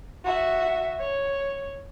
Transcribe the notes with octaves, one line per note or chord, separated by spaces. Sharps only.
F#4 E5
C#5